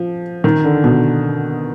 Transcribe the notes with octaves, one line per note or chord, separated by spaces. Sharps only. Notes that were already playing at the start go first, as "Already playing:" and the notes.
Already playing: F3
D#3
D3
B2